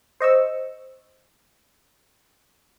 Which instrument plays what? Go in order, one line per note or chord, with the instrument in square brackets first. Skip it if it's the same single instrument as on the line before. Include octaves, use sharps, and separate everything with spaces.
[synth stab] C5 D#5 C#6 E6